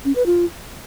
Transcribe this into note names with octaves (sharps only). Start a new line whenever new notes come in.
C#4
B4
F4